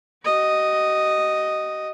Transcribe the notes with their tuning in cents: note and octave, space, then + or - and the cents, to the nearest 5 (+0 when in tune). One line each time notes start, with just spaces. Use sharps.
F#4 +45 D#5 +0